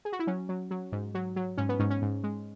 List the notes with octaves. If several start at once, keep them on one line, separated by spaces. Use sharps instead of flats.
G#4
F#4
E4
F#3 C#4
F#3
F#3
G#2
F#3
F#3
G#2 C#4
B3
G#2 C#4
C#4
G#2
G#3